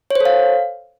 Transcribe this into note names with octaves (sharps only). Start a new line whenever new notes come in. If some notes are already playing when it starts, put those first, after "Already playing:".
A4 C5 C#5 F5